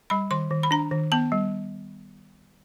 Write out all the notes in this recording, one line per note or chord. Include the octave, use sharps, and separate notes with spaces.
G3 B5
D#3 C6
D#3
B5
D4 A#5
D#3
B3 A5
G3